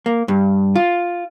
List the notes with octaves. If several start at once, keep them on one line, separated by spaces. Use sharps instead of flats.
A#3
G2
F4